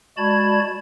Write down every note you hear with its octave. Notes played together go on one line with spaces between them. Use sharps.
G#3 F#4 D5 A5 B5 G#6